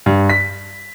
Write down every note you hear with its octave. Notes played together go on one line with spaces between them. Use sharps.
G2
B6